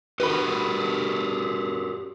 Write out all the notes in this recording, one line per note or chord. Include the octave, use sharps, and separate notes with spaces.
F#4 G4 A#4 B4 B5